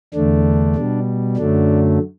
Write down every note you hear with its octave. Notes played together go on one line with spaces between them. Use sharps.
E2 D3 A3 D4
B2 G3
F#2 D3 F#3 A3 D4